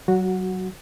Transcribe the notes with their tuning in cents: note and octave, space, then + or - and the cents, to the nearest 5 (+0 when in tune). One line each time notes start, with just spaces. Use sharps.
F#3 +25 F#4 +0 F#5 -15